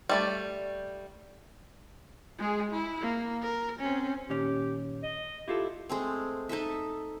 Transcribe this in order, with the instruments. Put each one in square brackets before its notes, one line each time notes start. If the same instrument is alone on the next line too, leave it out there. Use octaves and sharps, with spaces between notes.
[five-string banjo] G3 A3 D5
[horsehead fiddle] G#3 G#4
E4
A#3
A#4
C4 C#4
[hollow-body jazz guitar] A#2 D#3 C#4 [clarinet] G4
[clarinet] D#5
[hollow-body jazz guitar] E4 F4 A4 [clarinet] G4
[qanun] G#3 A3 C4
D#4 A4 D#5 E5